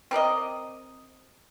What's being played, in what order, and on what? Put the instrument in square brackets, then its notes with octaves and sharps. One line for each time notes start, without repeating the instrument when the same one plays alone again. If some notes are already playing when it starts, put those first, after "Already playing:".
[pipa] C4 A#4 D5 D#5